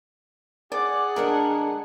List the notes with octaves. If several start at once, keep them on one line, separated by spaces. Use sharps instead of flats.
G#4 D5 F#5
D3 G#3 D4 A#4